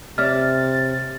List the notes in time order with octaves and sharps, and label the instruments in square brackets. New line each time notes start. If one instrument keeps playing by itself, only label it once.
[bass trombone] C3 [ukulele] C#5 D5 E5 [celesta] F6 [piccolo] A6